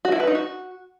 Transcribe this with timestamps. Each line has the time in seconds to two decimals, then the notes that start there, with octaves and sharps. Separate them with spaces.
0.05 F#4
0.12 E4
0.20 B4
0.27 D#4
0.35 F#4